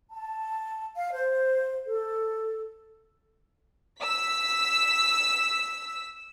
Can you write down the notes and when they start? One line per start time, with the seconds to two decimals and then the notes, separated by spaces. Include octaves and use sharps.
0.13 A5
0.96 F5
1.14 C5
1.85 A4
4.02 E6 B6